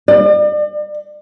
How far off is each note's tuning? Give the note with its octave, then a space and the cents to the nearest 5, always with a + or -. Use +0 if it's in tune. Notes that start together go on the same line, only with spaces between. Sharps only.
D5 +40